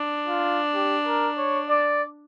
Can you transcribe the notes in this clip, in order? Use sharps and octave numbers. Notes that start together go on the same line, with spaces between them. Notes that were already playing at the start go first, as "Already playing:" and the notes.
Already playing: D4
F4
G4
A#4
C#5
D5